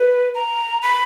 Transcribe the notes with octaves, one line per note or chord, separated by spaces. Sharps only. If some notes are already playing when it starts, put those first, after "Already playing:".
Already playing: B4
A#5
B5